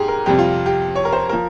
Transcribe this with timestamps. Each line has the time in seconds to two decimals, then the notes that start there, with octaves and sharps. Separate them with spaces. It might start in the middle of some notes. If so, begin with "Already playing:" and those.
Already playing: G#2 G3 G4 G#4
0.08 A#4
0.26 F2 C3 G3 G4
0.38 F4
0.66 G4
0.95 C#5
1.05 A#4
1.13 C5
1.29 F3 A#4